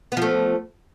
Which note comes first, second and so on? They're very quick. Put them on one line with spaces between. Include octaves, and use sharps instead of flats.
B3 F3 A3